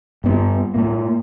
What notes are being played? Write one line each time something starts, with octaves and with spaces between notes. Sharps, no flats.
G2 B3
A2 A#3